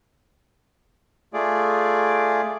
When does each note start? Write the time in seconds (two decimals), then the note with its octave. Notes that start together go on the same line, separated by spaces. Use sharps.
1.33 A3 F4 G#4 D5